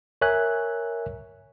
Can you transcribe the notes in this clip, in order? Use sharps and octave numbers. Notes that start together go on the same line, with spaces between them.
A#4 C#5 E5 G#5 F#6